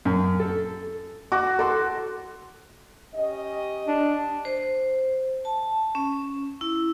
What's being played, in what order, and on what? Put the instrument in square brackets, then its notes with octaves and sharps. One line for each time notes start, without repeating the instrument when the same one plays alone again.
[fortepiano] F#2
A4
[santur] F#4 [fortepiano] D6
[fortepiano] A4 [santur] C6 D6
[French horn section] C#4 G4 D#5
[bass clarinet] D4
[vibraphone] C5
A5
C#4
E4